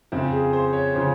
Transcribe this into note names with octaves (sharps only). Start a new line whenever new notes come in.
F2 C#3 F3 C4
G#4
C5
C#5
C#3 F3 C5